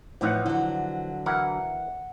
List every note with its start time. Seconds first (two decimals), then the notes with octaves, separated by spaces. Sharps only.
0.21 A2 E3 F3 B3 D#4 F#5
0.46 D3 F#3
1.26 E3 E4 A#4 F#5